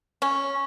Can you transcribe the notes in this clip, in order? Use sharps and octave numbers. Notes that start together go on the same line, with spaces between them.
C#4